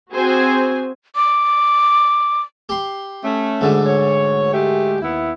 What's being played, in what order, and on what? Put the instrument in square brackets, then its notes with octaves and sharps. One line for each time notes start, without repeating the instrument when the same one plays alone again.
[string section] C4 F#4 G#4 C5 G#5
[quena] D6
[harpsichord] G4 C6
[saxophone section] A3 C#4
[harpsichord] D2 G#2 D3
[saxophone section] C#5
G#3 A3 G4
D#2 B3 E4